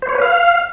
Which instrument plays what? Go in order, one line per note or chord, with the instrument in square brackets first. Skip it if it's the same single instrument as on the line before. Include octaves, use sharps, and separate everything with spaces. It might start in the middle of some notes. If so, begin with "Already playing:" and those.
[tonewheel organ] C5
C#5
B4
F5